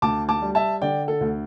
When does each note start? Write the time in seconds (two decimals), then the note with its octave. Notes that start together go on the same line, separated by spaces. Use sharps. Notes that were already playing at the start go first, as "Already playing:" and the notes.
0.02 D2 A5 D6
0.29 A5 D6
0.42 G3
0.55 E5 A5
0.82 D3 D5 G5
1.08 A4
1.21 D2